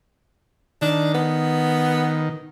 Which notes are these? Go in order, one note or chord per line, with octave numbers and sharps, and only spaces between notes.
D#3 D4
B3